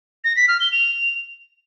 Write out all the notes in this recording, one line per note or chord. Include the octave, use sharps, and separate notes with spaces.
A#6
B6
F6
G7
F7